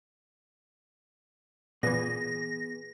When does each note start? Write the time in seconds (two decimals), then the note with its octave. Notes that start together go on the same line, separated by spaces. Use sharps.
1.83 A#2 E3 B3 G#4 B4 A#6